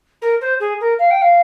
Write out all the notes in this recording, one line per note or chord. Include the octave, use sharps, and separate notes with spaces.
A#4
C5
G#4
A#4
F5
G5
F5